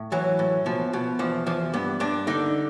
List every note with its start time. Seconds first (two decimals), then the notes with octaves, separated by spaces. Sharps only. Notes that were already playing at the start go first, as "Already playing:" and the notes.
Already playing: A2
0.12 E3 F#3
0.39 A2
0.66 B2 F3
0.93 B2
1.19 E2 F3
1.47 E2 F3
1.74 G2 B3
2.00 G2 D4
2.27 D3 D#4